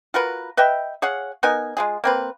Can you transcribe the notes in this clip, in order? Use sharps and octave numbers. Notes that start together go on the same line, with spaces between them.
F4 F#4 A#4 B4
B4 D#5 E5 G5
G#4 C#5 F5 F#5
B3 D#4 A#4 G#5
G#3 F4 G#4
A#3 C4 B4